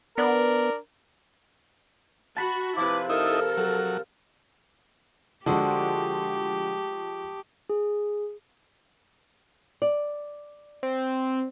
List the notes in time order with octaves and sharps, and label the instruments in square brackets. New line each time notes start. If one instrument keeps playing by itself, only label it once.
[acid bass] B3 [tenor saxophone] D4 [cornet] A#4
[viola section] F#4 [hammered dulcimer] A5 B5
[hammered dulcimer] C3 F3 [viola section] E4 B4 [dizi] D6
[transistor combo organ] D#4 E4 [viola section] A4 [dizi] A#4
[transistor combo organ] F#3
[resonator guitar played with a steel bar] D3 F#4 [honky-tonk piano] F3 G#3 [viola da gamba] G4 [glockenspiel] A5 C#6 D#6
[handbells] G#4
[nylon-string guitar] D5
[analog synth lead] C4